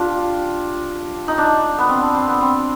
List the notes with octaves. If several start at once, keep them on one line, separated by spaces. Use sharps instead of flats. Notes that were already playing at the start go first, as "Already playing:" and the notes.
Already playing: D4 F4 G4
D#4
D4
B3
C4
D4
C4
B3
C4